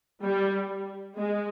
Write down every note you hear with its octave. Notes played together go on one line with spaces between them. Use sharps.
G3
G#3